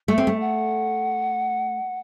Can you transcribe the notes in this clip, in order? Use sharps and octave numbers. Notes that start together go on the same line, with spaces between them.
A3 E5
C4
A3
F#5